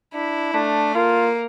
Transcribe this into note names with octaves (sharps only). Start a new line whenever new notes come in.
D4 E4
A3 D4
A#3 F4